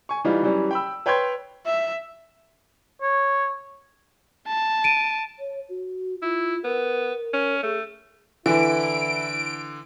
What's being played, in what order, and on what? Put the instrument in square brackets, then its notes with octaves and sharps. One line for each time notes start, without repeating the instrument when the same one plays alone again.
[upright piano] G#5 C#6
E3 G3 D#4 F4
E3 F#3 G3 C#4
G5 B5 E6
B4 C#5 G5 B5 C6 G#6
[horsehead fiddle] E5
[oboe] C#5
[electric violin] A5
[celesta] D7 D#7
[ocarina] C#5
F#4
[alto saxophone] E4 [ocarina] F4
[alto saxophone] B3 [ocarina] A#4
[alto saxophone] C#4
[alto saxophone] A3 [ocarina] G#4
[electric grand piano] D3 [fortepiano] E3 [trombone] E4 [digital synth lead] D7